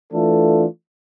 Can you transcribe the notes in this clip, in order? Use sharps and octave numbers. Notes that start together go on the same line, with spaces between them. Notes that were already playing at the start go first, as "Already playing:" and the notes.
E3 A3 D4 F4 A4